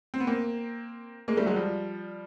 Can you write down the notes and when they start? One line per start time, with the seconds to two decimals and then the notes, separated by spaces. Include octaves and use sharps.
0.14 C4
0.20 B3
0.27 A#3 C4
1.28 G#3 A#3
1.37 G3 A3
1.46 F#3 G#3
1.56 F3 G3